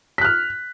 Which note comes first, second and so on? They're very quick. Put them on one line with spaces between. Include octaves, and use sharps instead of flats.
B6 F#6 F6